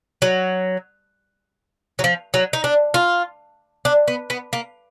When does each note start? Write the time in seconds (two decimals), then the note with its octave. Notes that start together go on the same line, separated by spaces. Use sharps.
0.22 F#3
1.99 F#3
2.04 F3
2.34 F#3
2.53 D#4
2.64 D4
2.94 F4
3.85 D4
4.08 B3
4.30 B3
4.53 A#3